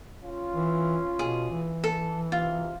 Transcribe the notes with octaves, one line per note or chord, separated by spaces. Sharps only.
C#4 F4
E3
B2 G#4
E3
A4
B1 C3 F4